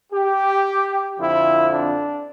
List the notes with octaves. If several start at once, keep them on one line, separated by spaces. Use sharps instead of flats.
G4
F2 D3 F3 C4 E4
D4